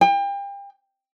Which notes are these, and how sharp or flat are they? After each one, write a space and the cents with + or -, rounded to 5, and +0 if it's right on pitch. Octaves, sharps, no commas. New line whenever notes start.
G5 +35